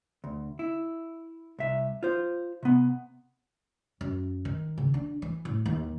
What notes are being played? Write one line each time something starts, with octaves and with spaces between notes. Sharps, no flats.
D2
E4
C2 E5
F4 C5
C3 B3
F#2
D#3
C#3
D4
E3
A2
D#2